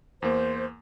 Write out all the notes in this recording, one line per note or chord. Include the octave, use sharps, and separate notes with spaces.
E2 A#3 C5